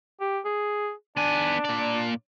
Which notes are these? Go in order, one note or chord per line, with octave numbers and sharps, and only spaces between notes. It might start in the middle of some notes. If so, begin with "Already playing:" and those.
G4
G#4
B3 D4 G#5
A#2 D5